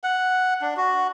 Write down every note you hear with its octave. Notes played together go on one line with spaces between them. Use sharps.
F#5
D4
F#4